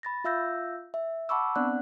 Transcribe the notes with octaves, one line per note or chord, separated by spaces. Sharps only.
B5 A6 A#6
F4 E5 F5 E6 G6 A#6
E5
F#5 A5 B5 C#6 D6 E6
B3 C4 D4 D5 F#5 F#6